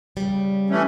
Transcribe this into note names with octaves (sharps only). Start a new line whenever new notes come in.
C#3 G3
E3 A3 C#4